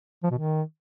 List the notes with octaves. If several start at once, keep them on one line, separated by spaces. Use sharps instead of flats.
F3
B2
D#3